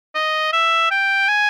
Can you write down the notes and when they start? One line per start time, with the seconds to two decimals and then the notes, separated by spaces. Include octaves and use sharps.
0.15 D#5
0.53 E5
0.91 G5
1.28 G#5